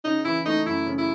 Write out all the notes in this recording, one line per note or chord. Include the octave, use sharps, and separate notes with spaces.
C#3 D#4
E3 E4
A3 D#4
F#2 E4
C#3
E4